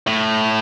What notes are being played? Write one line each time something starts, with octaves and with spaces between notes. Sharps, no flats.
A2